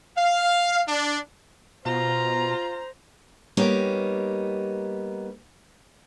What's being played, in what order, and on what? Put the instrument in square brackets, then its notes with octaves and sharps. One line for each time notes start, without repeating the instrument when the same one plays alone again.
[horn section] F5
D4
[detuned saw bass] B2 [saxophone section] F4 [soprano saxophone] C5 [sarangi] A#5
[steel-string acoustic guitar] G3 A#3 B3 D#4 G4 C#5